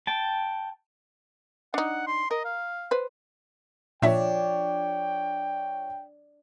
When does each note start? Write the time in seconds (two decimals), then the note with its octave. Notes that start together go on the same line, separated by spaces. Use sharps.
0.07 G5 A5
1.74 D4 D#4 F#5
2.07 C6
2.31 A#4 D#5
2.45 F5
2.91 B4 C5
4.02 A#2 F3 D4 C#5 E5 G5